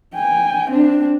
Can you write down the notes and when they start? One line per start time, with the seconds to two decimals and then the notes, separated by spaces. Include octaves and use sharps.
0.14 G5 G#5
0.71 C4 D4